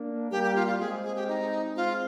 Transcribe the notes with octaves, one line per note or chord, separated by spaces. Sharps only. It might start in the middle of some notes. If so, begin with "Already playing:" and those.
Already playing: A#3 D4
G3 A#3 G4
G4
F4
F4
G#3 C4 G#4
G#4
G4
D#4
G#3 C4 F4